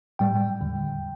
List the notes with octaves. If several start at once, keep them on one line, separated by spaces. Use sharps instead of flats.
A2 G3 G5
E2 D3 G3